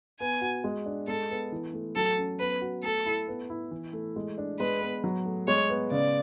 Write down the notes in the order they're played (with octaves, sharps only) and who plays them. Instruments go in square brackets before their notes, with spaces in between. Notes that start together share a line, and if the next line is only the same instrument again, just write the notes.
[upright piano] B3 [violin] G#5
[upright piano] F#4
G#3
D4
[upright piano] G#3 [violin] A4
[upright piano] B3
E3
A3
[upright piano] F#3 [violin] A4
[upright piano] C#4
[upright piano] B3 [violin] B4
[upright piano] F#4
[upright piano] A3 [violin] A4
[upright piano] E4
B3
E4
E3
A3
G#3
D4
[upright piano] G#3 [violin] B4
[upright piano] B3
F#3
A3
[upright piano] G#3 [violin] C#5
[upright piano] B3
[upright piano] C#3 [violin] D5